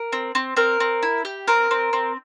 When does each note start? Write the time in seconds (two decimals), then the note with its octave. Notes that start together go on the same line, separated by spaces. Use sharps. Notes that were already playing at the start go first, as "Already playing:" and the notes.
Already playing: A#4
0.12 C4
0.35 C4
0.57 C4 A#4
0.80 C4
1.03 E4
1.25 G4
1.47 C4 A#4
1.71 C4
1.93 C4